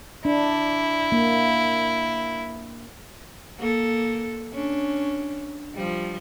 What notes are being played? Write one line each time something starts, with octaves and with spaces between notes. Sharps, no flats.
D4 E4
A#3
A#3 A4
C#4 D4
F3 G3